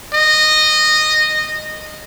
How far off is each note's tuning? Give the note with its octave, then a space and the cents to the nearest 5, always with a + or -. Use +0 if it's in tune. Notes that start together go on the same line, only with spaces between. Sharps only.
D#5 -15